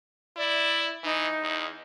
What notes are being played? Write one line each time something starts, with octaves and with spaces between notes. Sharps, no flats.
E4 D5
E3 D#4
E2